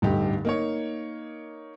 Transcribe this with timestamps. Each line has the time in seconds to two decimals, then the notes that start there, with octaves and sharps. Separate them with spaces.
0.02 D1 G2 D3 D#4 G4
0.45 A#3 D#4 C#5